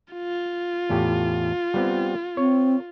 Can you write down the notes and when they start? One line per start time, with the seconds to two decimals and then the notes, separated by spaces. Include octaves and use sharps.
0.13 F4
0.90 E2 A2 G4
1.74 G3 B3 C4
2.37 C4 C#5